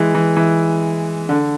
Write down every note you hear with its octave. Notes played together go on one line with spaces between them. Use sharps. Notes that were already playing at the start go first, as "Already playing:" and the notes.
Already playing: E3 G#3
E3
E3
D3